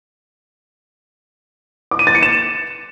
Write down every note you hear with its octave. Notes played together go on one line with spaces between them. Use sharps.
D6
D#7
A6
C#7
E7